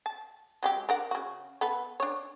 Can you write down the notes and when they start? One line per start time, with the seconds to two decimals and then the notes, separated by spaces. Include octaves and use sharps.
0.06 A5
0.63 F#3 G#3 G4
0.89 D4 A#4 F#5
1.11 C#3 F#4
1.61 B3 A4 B4
2.00 D4 C#5